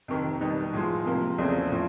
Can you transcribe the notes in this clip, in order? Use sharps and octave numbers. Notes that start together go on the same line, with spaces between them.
F2 C3 D#3
B2 G3 B3 D#4
A2 F3 G#3
C3 F3 A#3
E2 C#3 F3 A3 C4
A2 F3